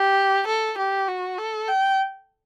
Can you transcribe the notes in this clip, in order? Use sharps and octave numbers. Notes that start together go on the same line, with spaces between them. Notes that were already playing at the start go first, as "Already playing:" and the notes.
Already playing: G4
A4
G4
F#4
A4
G5